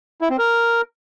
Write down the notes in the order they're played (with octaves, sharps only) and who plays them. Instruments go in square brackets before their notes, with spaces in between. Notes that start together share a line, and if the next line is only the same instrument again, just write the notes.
[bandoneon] E4
C4
A#4